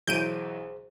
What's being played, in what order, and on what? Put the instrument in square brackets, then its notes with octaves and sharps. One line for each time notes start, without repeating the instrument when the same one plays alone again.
[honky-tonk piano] B1 E3 F#3 [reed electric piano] G#4 C5 [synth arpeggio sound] G6 D7 D#7